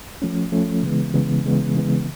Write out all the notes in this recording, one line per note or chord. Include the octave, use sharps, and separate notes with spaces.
F3 A3 C#4
F3 A3 C#4
C#3 E3 G#3 B3
C#3 E3 G#3 B3
C#3 E3 G#3 B3
C#3 E3 G#3 B3